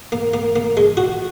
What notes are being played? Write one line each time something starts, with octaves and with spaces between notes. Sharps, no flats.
A#3
A#3
A#3
G#3
F#4